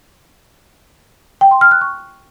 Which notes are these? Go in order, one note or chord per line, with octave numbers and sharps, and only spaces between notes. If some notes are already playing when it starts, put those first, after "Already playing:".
G5
C6
F6
F#6
C#6